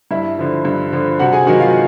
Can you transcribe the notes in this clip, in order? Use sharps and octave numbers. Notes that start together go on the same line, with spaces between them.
G2 E4 E5
D3 F3
G2
D3 F3
C3 F#4 F#5
G#4 G#5
D#3 F#3 A#3 F#4 F#5
F4 F5